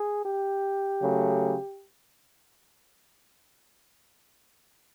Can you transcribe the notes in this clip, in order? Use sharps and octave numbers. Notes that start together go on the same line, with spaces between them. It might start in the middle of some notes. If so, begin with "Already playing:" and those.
Already playing: G#4
G4
C#3 F#3 A3